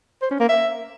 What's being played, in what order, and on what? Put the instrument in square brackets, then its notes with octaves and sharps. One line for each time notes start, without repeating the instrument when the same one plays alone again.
[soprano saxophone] C5
C#4
A#3
E5